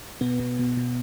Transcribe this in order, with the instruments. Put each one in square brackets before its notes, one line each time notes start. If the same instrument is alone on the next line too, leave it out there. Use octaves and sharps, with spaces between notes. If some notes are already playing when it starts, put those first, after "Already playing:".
[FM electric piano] B2 B3
B2
B2
B2